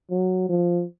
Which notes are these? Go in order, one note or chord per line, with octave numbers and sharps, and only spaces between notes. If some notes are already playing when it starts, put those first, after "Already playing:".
F#3
F3